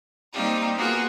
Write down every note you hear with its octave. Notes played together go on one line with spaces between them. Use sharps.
G3 A#3 C4 D#4 F4 G4
A#3 B3 F4 F#4 G#4 A#4